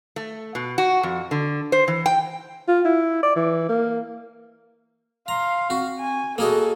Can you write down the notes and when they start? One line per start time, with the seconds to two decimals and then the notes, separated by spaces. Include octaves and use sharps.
0.16 A3
0.55 B2
0.78 F#4
1.03 F2
1.31 D3
1.72 C5
1.88 E3
2.06 G5
2.68 F4
2.85 E4
3.23 D5
3.36 E3
3.68 A#3
5.28 F5 A#5 C6
5.70 C4 F#4
5.99 G#5
6.38 A#3 F#4 G#4 A4 D#5